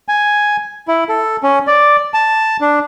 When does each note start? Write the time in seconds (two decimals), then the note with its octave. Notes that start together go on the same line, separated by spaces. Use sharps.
0.08 G#5
0.88 E4
1.09 A4
1.43 C#4
1.67 D5
2.14 A5
2.61 D4